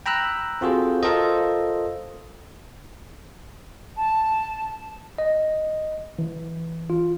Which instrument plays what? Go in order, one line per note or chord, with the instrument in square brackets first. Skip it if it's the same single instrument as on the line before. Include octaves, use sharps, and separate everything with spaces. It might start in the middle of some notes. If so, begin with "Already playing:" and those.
[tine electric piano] G5 A#5 B5 E6 F#6
C4 F4 F#4 G#4 A4 C5
F4 A4 A#4 C5 D#5
[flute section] A5
[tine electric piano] D#5
E3
F4